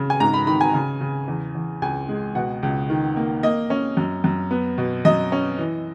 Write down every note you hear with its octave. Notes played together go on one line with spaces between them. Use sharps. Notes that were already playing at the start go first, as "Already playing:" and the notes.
Already playing: C#3
G#5
G#2 A#5
B5
D#3 B5
G#5
C#3
C#3
E2
E2
C#2 G#5
G#3
B2 F#5
C#2
D#3
A#3
A#3 D#5
C#4
F#2
F#2
B3
B2
F#2 D#5
C#4
E3